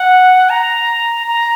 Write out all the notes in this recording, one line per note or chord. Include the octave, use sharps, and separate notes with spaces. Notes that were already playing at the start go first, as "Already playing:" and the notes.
Already playing: F#5
A#5
A#5